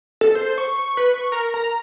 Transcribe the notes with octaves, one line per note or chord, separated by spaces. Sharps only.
A4
C5
C#6
B4
C#6
A#4
A#5